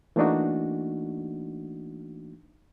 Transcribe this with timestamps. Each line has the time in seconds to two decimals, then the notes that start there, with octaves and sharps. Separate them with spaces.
0.16 E3 A3 A#3 D4 D#4 F#4